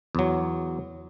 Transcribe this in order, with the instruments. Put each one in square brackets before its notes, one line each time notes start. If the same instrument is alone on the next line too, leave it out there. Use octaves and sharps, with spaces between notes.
[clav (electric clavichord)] E2 F#3